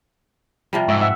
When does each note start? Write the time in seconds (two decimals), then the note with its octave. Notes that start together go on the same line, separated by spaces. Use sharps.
0.73 C3 F3 G3
0.88 G#2 E5 C#6
1.01 E5 F#5